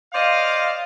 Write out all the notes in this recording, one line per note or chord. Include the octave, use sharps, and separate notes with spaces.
C5 D5 D#5 F5